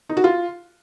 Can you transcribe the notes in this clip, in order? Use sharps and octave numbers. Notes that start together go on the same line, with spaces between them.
D#4
F#4
F4